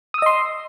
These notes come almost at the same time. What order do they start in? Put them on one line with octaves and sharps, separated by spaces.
D#6 E6 D#5 C6